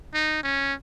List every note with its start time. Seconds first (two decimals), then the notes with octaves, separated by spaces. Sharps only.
0.14 D#4
0.43 C#4